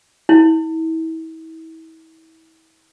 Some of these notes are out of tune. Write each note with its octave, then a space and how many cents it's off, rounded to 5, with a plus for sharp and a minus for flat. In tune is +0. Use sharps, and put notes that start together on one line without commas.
E4 -35